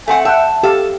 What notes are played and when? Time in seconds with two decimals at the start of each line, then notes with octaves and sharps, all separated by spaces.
0.08 A3 C4 F#5 G#5
0.25 E5 F#5 G5 A5
0.63 G4 A4 F5